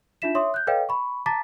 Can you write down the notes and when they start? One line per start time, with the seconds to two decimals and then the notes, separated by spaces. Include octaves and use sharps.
0.22 D4 D#4 F4 E5 B6 E7
0.35 C#5 E5 C6 D6 D#6
0.54 F#6 G6
0.67 A4 B4 C#5 D#5 F5 G5
0.89 B5 C#6
1.26 A5 A#5 D6 A6 B6